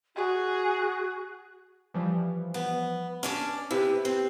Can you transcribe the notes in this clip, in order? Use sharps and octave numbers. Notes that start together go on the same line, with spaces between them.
F#4 G#4
E3 F3 G3
B3
C#4 D4 D5 F6
C3 E4 B4
C4